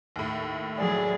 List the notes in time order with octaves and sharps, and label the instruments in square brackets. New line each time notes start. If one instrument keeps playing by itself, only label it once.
[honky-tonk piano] D#2 A2
[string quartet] F#3 G#4 D5